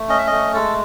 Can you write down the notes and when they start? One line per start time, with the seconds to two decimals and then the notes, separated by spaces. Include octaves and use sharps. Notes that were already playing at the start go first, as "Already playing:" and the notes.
Already playing: A3
0.09 C#4 D#5
0.18 E5
0.27 A3 D#5
0.54 G#3 A4